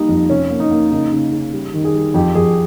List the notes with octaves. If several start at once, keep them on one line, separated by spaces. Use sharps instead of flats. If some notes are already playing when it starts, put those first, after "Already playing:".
Already playing: G3 A#3 D#4
F2
C3 C#4
A#3
D#4
A#3
C#3 D#4
C#3 D#4
C#3
G3
D#3
G#4
G3
F2 G4
F2 G#4